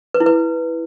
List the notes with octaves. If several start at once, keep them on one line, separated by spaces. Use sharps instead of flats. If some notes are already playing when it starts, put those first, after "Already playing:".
B4
E4
B4